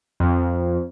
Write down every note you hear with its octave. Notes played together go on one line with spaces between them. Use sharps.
F2